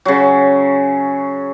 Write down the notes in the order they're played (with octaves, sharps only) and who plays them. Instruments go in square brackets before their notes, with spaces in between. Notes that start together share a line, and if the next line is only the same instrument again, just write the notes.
[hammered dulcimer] C#3 F#3